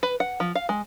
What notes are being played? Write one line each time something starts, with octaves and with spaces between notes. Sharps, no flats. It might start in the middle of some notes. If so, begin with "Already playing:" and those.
B4
F#5
F3
F5
G#3